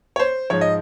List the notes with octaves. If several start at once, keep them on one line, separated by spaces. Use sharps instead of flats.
C#5
C5
G#2 F3 G#3 C#5
D#5